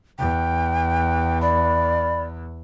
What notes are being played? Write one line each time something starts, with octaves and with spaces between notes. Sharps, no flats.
E2 G5
D5 B5